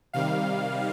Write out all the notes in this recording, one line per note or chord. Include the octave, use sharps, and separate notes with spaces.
C3 D#3 G3 F5